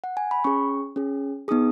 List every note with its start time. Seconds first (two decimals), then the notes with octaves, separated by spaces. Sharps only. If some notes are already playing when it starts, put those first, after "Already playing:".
0.04 F#5
0.17 G#5
0.31 B5
0.44 C#4 G#4 C#6
0.96 C#4 G#4
1.48 B3 D#4 G#4 D#6